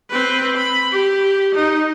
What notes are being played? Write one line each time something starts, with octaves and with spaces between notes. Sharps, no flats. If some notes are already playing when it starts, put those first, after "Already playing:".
C4 B4
B5
G4
D#4